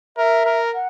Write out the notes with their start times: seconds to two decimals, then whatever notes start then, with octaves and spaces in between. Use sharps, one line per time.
0.17 A#4 E5
0.45 A#4
0.74 F#5